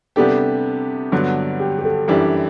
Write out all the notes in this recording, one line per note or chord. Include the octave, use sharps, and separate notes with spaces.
C3 G3 B3 D4 G4 A4
G2 D3 F#3 B3
G4
G4
A4
F#2 E3 G3 D4 G4